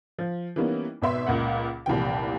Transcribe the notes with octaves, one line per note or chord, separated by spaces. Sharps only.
F3
E3 G3 A#3 B3 C#4 D#4
G#1 B2 B4 E5 C6
C#2 A#2 A#3 F#5
F1 C2 A#2 E3 G5